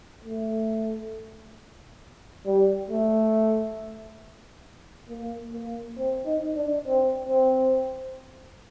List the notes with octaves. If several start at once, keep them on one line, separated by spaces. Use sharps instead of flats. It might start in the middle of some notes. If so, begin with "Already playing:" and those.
A3
G3
A3
A#3
A#3
C4
D#4
D4
C4
C4